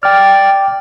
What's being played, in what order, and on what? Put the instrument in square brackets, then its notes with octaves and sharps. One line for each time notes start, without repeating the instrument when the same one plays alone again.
[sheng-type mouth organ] D5 [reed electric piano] G5 F6